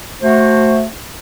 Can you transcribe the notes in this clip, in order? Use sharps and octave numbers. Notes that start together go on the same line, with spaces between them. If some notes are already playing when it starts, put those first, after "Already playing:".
A3 F#4 C5